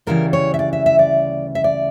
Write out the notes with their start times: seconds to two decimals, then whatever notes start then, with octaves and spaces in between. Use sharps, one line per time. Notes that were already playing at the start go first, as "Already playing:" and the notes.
0.07 D2 C#3 E3 G3 A#4
0.33 C#5
0.54 E5
0.59 D5
0.73 E5
0.86 E5
0.99 D5
1.55 E5
1.64 D5